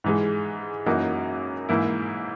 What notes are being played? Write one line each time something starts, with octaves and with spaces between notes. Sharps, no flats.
G#2 E3 G#3
F#2 E3 A#3 D#4 F#4
G#2 E3 A#3 E4